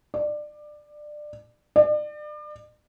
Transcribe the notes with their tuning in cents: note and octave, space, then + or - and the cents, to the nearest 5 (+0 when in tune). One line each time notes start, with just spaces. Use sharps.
D5 +20
D5 +35